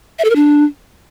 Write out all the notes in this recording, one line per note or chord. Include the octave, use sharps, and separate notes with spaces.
E5
A4
A#4
D4